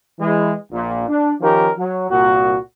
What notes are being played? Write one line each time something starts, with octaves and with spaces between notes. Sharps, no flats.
E3 G#3
A#1 A#2
D4
D#3 F3 C#4 D#4 G4 A#4
F#3
C2 A#2 F#4